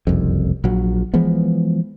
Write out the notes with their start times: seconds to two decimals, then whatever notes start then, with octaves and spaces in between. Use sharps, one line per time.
0.07 F#1 C2 F2
0.64 A#1 F#3
1.14 E3 F3 G#3 B3